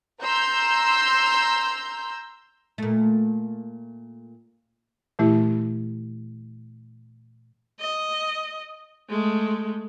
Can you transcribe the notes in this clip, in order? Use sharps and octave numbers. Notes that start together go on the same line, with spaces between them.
A#5 C6 E6 G6
A#2 A3
A#2 E3 A3 E4 G4
D#5
G#3 A3